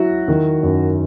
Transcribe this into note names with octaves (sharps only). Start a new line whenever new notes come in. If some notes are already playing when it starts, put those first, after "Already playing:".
Already playing: F#3 E4 F#4
D#3
F#2